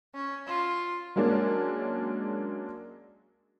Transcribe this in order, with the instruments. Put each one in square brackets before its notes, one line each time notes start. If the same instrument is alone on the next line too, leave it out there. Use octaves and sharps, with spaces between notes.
[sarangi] C#4
F4
[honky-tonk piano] F#3 G#3 A#3 C#4 D4